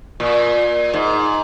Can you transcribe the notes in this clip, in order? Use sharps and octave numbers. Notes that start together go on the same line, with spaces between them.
A#2
G#2